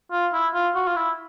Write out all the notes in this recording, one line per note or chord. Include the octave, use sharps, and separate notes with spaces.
F4
E4
F4
F#4
F4
E4